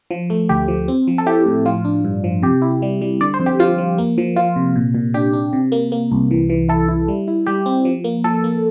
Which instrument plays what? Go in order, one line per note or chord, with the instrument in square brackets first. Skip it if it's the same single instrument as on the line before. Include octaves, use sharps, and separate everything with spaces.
[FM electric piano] F3
A3
D2 G4
F3
C4
F3
A4
E4 G4
A2
F3 F4
D4
G2
F3
C3 G4
E4
G3
G3
D3 D5
C5
F2
G4
F3 F4
F3
A#3
F3
F3 F4
C3
A#2
A#2
D4 G4
D4
C3
A#3
A#3
C2
E3
E3
E4 A4
E4
G3
E4
G3 G4
C4
F3
A#3
F3 A4
A#3